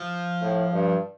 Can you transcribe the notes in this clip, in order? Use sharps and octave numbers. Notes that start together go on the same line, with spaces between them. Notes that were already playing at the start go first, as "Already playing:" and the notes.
Already playing: F3
A2
G2